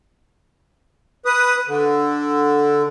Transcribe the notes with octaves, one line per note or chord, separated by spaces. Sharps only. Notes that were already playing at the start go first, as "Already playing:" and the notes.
B4 D#6
D3